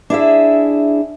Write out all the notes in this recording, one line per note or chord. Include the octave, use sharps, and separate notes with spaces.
D4 E4 G#4 E5